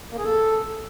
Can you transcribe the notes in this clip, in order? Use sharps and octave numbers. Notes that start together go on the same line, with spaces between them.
A#3
G#4
A4